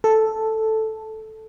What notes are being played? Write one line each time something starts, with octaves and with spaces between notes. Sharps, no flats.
A4